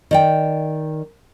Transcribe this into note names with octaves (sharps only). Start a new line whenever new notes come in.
D#3 D5 G5